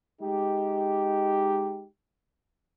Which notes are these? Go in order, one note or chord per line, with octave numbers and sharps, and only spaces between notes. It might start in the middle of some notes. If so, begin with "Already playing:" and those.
G#3 D#4 G4